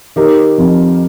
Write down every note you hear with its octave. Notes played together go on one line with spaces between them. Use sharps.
D#3 G4 A#4
F2